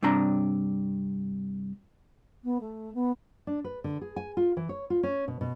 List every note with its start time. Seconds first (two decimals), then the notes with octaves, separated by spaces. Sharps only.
0.03 G2 C3 D4 A#5
2.44 B3
2.60 A3
2.94 B3
3.47 D4
3.64 B4
3.84 D3
4.01 G#4
4.16 G#5
4.37 F4
4.57 E3
4.69 C#5
4.90 F4
5.03 C#4
5.28 B2
5.41 B2